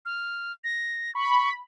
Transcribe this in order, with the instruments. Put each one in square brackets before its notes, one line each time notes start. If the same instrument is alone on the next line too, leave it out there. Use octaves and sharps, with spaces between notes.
[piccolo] F6
A#6
[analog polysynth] B5 [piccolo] C#6